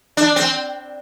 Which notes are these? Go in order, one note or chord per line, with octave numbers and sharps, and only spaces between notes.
D4
C4